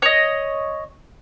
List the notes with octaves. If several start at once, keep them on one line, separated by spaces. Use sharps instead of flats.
C#5 D#5